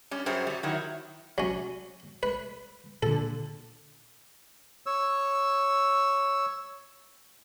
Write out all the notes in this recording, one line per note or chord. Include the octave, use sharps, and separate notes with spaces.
G3 C#4
F#2 F#3 G3 G#4 C5
F#3 G3
D#3 F#3 E4
F#3 C#4
B4
A#2 D3 A4
C#5 E6